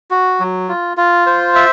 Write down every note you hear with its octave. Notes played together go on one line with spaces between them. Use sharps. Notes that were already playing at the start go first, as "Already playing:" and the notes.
F#4
F#3
F4
F4
C5
E5